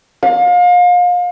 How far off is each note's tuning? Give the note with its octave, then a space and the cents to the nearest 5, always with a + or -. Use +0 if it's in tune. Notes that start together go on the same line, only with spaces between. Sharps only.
F5 +35